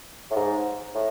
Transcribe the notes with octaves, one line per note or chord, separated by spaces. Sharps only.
A2
G#2
A2